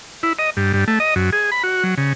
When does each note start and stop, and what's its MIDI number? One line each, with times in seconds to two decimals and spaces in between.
0.23 0.33 64
0.39 0.50 75
0.57 0.73 43
0.74 0.84 43
0.88 0.99 57
1.00 1.14 75
1.16 1.30 42
1.33 1.51 68
1.52 1.63 83
1.63 1.83 66
1.84 1.95 54
1.98 2.13 49